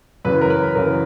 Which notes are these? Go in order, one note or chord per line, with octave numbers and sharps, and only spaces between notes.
F#2 C#3 E3 B4
A#4
B4
F#2 C#3 E3 A#4